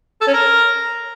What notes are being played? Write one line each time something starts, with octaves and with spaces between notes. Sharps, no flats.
A4
C#4
A#4